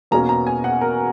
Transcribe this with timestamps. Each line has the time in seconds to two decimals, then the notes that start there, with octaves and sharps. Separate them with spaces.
0.11 E2 B2 A#3 C#4 A#5
0.29 A#5
0.47 G#5
0.64 F#5
0.81 A#4